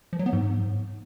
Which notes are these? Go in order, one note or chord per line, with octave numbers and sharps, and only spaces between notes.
F3
F#3
B3
G#2